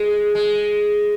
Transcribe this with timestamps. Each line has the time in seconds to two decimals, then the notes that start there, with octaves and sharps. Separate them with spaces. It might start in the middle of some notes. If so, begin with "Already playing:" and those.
Already playing: G#3
0.35 G#3